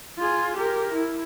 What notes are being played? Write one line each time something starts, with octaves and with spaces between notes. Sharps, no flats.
F4 G#4
G4 A#4
E4